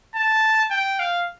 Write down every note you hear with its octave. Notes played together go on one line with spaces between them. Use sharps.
A5
G5
F5